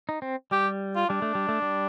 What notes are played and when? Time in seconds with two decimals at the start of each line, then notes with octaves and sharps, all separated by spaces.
0.09 D#4
0.22 C4
0.51 G3 G4
0.96 F4
1.09 G3 D4
1.22 A3
1.35 G3
1.49 A3
1.62 G3